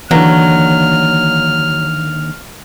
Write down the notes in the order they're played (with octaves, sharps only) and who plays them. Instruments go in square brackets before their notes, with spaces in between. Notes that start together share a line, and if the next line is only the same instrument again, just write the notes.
[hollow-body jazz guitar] D#2 D3 [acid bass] E3 [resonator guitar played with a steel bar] F#3 [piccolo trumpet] F6